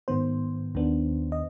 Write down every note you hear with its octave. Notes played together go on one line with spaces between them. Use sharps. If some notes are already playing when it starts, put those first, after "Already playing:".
G#2 D#3 B3 C5
D#2 D#3 B3 D4
D#5